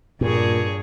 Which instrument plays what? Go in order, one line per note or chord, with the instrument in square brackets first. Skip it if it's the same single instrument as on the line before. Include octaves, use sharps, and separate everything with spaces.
[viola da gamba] G2 G#4 C#5 [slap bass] A#2